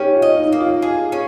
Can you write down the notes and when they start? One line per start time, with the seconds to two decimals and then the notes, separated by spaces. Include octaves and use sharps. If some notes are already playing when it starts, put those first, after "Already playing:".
Already playing: C#4 D#4 G4
0.15 F4
0.22 D#5
0.38 D#4
0.53 A#3
0.61 F4
0.82 F4 G#4
1.12 C#4